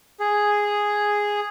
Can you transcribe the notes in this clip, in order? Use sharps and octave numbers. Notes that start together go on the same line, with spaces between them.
G#4